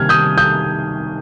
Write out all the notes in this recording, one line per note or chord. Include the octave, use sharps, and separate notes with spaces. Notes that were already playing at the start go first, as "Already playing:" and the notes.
Already playing: C3 D#3 G3 A#3 F6 G#6
D#6 G6
D#6 G6